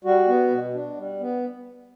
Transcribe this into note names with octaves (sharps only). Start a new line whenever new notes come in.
G3 F#4
B3
B2
D4
G3
B3